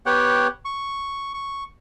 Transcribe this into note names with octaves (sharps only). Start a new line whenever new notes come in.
B3 G4 C#5 F#5 G5
C#6
C#6